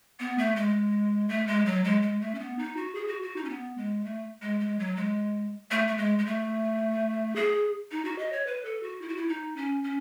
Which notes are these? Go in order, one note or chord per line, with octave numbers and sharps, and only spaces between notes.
B3
A3
G#3
A3
G#3
F#3
G#3
G#3
A3
C#4
B3
D#4
F#4
G#4
F#4
F#4
D#4
C#4
B3
G#3
A3
G#3
G#3
F#3
G#3
A3
A3
G#3
G#3
A3
G#4
D#4
F#4
D#5
C#5
B4
A4
F#4
E4
F#4
E4
D#4
C#4
C#4